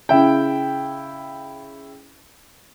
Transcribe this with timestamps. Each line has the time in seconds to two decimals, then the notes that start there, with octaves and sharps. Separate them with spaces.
0.09 C#3 E4 G5